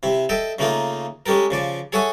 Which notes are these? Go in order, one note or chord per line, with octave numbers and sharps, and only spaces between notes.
C3 E4
A4 D#5 E5 G5
C#3 A3 A#3 D#4 F4 A#4
G#3 C#4 G4 A4 A#4
C#3 F3 D5
G#4 A4 C#5 E5 F#5 G#5